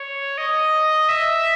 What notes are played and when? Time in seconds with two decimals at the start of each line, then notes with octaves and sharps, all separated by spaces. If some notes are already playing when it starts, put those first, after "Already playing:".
Already playing: C#5
0.38 D#5
1.09 E5